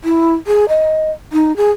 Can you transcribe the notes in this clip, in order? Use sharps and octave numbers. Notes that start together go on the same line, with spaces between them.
E4
G#4
D#5
D#4
G#4